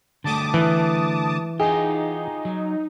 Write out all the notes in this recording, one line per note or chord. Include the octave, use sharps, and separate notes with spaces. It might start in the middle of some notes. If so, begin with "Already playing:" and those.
D3 G3 A3 A5 D6 D#6
E3
D#4 F4 G4 G#4
F#3